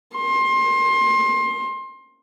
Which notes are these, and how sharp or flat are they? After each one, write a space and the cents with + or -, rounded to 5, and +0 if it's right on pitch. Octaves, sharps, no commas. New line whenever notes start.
C6 +25